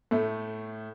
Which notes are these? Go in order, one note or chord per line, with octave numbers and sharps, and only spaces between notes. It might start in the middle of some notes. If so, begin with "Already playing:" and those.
A2 A3